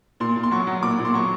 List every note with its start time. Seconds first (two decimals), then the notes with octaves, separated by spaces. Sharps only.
0.20 A#2 C6
0.36 A#2
0.43 C6
0.51 F#3 C#6
0.67 F#3
0.83 A#2 D6
0.99 A#2
1.05 C6
1.14 F#3 C#6